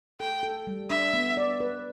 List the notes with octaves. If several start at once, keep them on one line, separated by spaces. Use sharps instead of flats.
A4 G5
A4
G3
D4 E5
B3
D5
B4